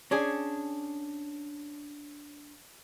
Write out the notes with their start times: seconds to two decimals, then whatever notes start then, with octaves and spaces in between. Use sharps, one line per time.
0.11 C#4 D4 G#4